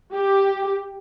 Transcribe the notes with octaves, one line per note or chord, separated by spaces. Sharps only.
G4